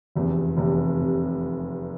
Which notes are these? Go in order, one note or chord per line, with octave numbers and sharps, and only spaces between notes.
F1 E2 C3
F1 E2 C3
C3